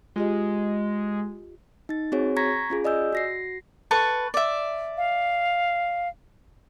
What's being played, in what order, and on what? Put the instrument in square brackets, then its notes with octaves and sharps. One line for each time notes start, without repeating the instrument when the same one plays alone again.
[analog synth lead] G#3 [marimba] F4 G4 D#5
[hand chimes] D#4 A6
C4 F#4 G#4 C#5
A#5 C#6 G#6 A#6 B6
C#4 F4 G#4
D5 D#5 G#5 E6 G6
F#4 A#6 C7
[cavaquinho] A4 B4 C#6
D5 E5
[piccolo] F5